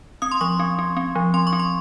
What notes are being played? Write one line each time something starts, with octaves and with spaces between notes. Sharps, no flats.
C4 D#6
C6
F3 C#6
C4
C4
C4
F3
C4 C6
C#6
C4
C6